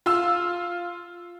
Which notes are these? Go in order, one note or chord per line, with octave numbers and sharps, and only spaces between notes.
F4 F5 E6